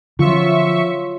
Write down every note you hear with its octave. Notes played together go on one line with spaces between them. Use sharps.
D3 F3 F#3 C#4 F4 E5 C#6